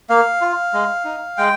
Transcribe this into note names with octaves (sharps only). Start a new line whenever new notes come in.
A#3 F5
F4
G#3
D#4
G#3 G5